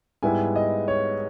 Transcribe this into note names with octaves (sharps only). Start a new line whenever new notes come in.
G#2 G3 B3 E4 G#5
D#5
C#5